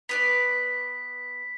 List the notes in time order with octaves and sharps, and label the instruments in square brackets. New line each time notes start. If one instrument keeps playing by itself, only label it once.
[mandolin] B3 B4 D5 [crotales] B6